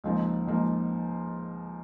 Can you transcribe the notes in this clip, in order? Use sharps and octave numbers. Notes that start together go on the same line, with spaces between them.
C#2 C#3 F3 A#3 D#4
C#2 C#3 F3 A#3 D#4